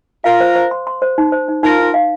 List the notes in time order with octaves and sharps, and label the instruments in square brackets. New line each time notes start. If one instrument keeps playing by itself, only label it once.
[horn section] F4 A#4 [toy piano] F5
[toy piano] C5
C5
C6
C6
C5
D#4
C5
D#4
[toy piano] D#4 [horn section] F4 A#4
[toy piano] D#4
F5